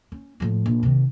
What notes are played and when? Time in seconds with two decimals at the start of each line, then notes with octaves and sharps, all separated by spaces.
0.12 C#4
0.40 A2 F3
0.66 A#1
0.83 C3 D#3